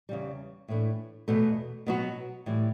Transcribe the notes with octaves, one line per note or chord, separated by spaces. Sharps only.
E2 C#3 G3
A2 E3 A3 D4
E2 B2 A3
B2 F#3 B3 F#4
A2 E3 G3